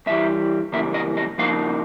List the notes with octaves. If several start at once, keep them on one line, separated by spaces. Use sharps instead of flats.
G2 E3 G3 E5
F#2 C#3 E3 G3 A#3 E5
D#5
D#5
C#3 F3 A#3 D#4 F5